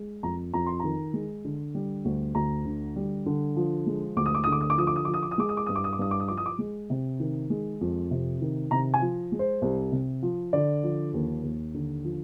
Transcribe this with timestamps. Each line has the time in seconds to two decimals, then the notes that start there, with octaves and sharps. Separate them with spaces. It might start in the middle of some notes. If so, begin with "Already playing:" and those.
Already playing: G#3
0.23 F2 A#5
0.54 F2 A#5
0.66 C6
0.80 D#3 A#5
1.14 G#3
1.45 D3
1.75 G3
2.05 D2
2.35 D2 A#5
2.65 D3
2.96 G3
3.26 D3
3.56 F3
3.87 G#3
4.17 D2 D6
4.26 D#6
4.35 D6
4.44 D3 D#6
4.52 D6
4.61 D#6
4.70 D6
4.78 F3 D#6
4.87 D6
4.96 D#6
5.05 F3 D6
5.14 D#6
5.23 D6
5.31 D#6
5.38 G#3 D6
5.49 D#6
5.57 D6
5.66 G2 D#6
5.76 D6
5.84 D#6
5.93 D6
5.99 G2 D#6
6.11 D6
6.20 D#6
6.28 F3 D6
6.37 D#6
6.46 D6
6.59 G#3
6.90 C3
7.20 D#3
7.50 G#3
7.81 F2
8.11 C3
8.41 D#3
8.71 C3 A#5
8.94 G#5
9.01 F3
9.32 G#3
9.39 C5
9.62 C2
9.92 C3
10.22 F3
10.53 D3 D5
10.83 F3
11.14 D#2
11.44 D#2
11.74 D3
12.04 F3